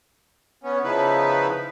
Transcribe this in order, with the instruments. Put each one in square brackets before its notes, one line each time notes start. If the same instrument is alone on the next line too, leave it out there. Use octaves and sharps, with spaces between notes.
[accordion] B3 C#4
C#3 F3 B3 D#4 E4 B4